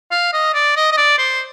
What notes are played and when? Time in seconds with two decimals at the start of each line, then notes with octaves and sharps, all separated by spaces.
0.11 F5
0.33 D#5
0.54 D5
0.76 D#5
0.92 D#5
0.97 D5
1.19 C5